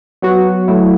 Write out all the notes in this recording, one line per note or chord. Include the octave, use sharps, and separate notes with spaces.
F#3 B3 F#4
F#3 A3 E4